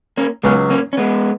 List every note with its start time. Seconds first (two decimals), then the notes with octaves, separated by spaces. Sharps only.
0.17 A#3 C#4
0.43 C#2 C#3 F#3 G#3 B3
0.70 A#3 C#4
0.93 C#4
0.97 G#3 B3